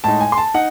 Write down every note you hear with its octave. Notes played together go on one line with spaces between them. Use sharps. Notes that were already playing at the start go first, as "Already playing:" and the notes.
A2 G#3 D#4 A5
G#5
C6
A5
D#4 F#5